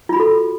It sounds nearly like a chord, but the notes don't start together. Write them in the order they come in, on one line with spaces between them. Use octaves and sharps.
F4 B5 F#4 A4